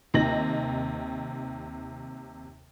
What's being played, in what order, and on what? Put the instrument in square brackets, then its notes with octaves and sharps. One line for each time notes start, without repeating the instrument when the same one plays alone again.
[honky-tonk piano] D#2 C3 D#4 A#6 F#7